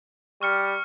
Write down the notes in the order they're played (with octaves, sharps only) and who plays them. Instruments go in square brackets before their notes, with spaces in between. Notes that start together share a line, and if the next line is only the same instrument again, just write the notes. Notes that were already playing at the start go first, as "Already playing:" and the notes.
[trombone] G3 [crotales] C#6 F6 C#7